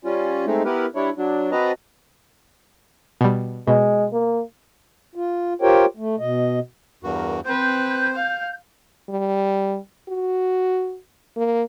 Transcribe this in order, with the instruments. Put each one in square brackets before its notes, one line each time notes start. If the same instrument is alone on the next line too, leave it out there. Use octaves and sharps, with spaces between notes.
[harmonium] G3 C#4 F4
G#3 A3 C4 D#4
B3 E4 G4 A#4 B4
G3 D4 E4 C#5
F#3 D4
C4 F#4 B4 D#5 A5 A#5
[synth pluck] B2 G3
[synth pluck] B2 [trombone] G#3
[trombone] A#3
[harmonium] F4
F4 G4 A#4 C5 C#5 G5
A3
B2 D#5
[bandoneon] E2 G2 F#4 [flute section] A#4
[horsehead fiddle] C4 B4 [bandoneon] C5 [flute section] G6
[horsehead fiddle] F5
[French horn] G3
F#4
A#3